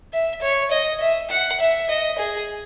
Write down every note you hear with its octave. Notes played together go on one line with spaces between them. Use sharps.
E5
C#5
D#5
E5
F#5
E5
D#5
G#4